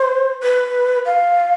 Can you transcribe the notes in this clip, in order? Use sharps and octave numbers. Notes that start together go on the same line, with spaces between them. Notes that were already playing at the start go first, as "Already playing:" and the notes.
Already playing: C5
B4
F5